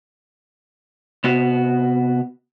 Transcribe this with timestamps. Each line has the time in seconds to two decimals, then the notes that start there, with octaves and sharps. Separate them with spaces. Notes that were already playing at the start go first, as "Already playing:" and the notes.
1.24 C3 B3 F#4